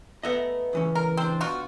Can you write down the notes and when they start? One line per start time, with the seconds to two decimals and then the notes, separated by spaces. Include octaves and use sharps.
0.23 A3 B3 D#5 E5 F#5 A#5
0.73 C#2 E3 C#4
0.95 A#4
1.17 C4 D4 C5
1.41 B2 F4 F#4